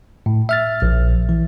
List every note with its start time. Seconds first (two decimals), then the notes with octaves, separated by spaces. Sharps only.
0.26 A2
0.49 E5 F6 A6
0.82 A#1
1.29 E3